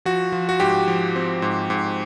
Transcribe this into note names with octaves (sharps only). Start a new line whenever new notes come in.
F3 F#4
F3
F#4
G#2 G4
F3
C4
G#2
G#2